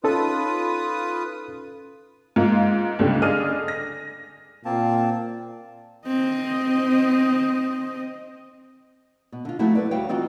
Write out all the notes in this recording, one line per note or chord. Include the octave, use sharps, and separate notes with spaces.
C#4 D#4 F4 A4 B4 D#6
G#2 A#3 F4
C#2 G#2 D3 G3
D3 D4 G#4 D#5 F6 D#7
A#6
A#2 A#3 C4 A5
C4 D#5
B2
D3 F4
F3 F#3 A3 C4 E4 F#4
A4 B4 D5
D2 G3 F#4 C#5 F5 G5
E3 C4 D#4 F4 F#4